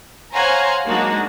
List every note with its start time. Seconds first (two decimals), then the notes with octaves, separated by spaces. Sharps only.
0.33 C5 C#5 F5 F#5 G#5 A#5
0.86 F#3 G#3 A#3 D4 D#4 F#4